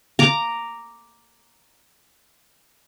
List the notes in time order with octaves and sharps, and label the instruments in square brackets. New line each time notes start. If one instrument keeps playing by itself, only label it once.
[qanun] A#5 D6